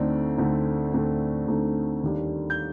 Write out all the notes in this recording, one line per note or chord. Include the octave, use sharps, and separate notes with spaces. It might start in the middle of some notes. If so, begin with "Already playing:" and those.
Already playing: D2 D3 A3 C4 D#4 D5
D2 D3 A3 C4 D#4
D2 D3 A3 C4 D#4
D2 D3 A3 C4 D#4
D#2 D#3 G3 D4
G6